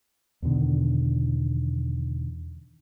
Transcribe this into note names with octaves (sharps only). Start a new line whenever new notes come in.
E2 B2 D3 D#3